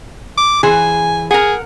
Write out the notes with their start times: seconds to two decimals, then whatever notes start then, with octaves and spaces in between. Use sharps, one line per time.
0.38 D6
0.63 E3 G#4 C5 G#5
1.31 G#4 A#4 F#5